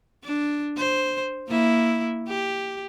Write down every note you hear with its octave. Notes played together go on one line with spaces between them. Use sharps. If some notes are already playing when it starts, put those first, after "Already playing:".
D4
C5
A#3 E4
G4